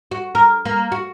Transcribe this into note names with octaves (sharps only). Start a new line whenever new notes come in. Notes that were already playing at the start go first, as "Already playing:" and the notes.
F#4
A#4
A#3
F#4